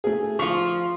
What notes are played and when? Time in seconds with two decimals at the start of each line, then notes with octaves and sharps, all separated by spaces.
0.04 A3 G#4
0.39 F3 F4 C#6